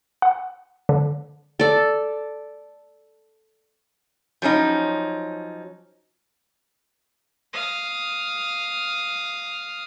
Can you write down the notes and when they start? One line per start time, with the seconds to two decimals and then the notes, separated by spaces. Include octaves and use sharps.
0.22 F#5
0.89 D3
1.60 A4 D5
4.42 F3 F#3 C#4 D#4
7.53 F5 D#6